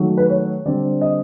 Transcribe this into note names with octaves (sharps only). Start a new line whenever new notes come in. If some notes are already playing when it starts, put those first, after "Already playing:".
Already playing: D#3 F#3 A3
B4
C#5
D3 G3 C4 D5
D#5